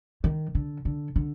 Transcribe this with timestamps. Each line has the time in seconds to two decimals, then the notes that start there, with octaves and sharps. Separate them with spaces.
0.24 D#3
0.55 D3
0.85 D3
1.16 D3